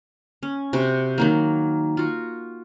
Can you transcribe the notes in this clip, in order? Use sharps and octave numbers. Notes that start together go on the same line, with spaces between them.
C#4
C3 F#4
D#3 F#3 A#3
F4 F#4